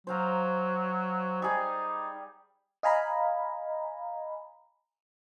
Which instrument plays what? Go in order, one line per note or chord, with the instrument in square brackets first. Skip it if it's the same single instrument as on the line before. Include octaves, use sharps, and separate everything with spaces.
[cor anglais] F#3 [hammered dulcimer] C5 F5 A#5
[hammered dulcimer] G3 G#4 D#5 [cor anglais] D#4
[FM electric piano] D#5 F5 G#5 A#5 B5